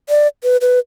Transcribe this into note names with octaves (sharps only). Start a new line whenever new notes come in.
D5
B4
B4